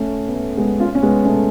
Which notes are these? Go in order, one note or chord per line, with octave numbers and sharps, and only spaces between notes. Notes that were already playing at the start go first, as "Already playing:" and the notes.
Already playing: A3 C#4
B3
A3
G#3 B3
C#4 F4
C#4
G#3 B3
A3 C#4